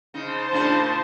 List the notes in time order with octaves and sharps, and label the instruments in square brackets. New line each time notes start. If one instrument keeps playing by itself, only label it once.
[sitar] C#3 D#4 [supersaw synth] C5 A5
[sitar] A2 C#3 D4